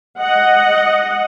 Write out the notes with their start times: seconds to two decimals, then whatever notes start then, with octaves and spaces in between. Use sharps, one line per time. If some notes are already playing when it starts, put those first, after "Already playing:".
0.20 D#5 F#5